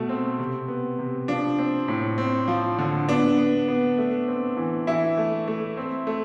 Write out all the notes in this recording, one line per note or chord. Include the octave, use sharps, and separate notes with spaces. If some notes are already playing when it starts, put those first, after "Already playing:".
Already playing: B2 A3
C4
C3
B3
C3
F3 D4
C4
A2
C4
F3
D3
B3 D4
B3
B3
A3
C4
E3
E3 E4
A3
A3
C4
A3